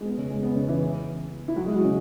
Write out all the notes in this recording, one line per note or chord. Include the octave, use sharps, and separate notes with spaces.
G#3
B3
C#3 C#4
G#3
B3
C#3 C#4
E3 E4
E4
F#3 F#4
G#3 G#4
F#3 F#4
E4
C#3 C#4